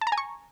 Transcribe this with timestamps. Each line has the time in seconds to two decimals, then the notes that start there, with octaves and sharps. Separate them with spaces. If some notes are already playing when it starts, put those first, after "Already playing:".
0.01 A5
0.07 A#5
0.12 G#5
0.18 C#6